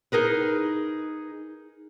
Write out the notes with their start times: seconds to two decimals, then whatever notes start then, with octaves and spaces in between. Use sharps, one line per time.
0.12 D#4 G#4 A#4 B4